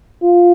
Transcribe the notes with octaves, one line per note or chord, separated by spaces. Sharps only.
F4